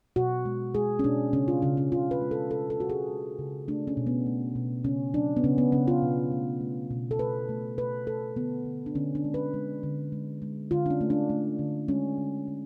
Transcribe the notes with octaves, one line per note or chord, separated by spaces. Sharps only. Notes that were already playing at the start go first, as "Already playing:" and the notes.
B2 F#4
G#3
G#3 G#4
C#4
B2 D4
C#3 C#4
F4
C#3 C#4
C#4
C#3 F4
B4
G#3
A4
C#3 A4
A4
G#3 F#4
G#4
G#3
C#3
A3 D4
C#4
B2
B3
A3
B2
C#3 C#4
F#3 D4
B3
C#3 C#4
B3
C#3 C#4
F4
B2
A3
A3
B2
A4
A3 B4
A3
B2 B4
A3 A4
D3 B3
D3
D4
D3 C#4
D4
G#3
B4
G#3
D3
G#3
G#3
D3 F4
D4
C#4
A3
D4
A3
D3
G#3 C#4
D3
D3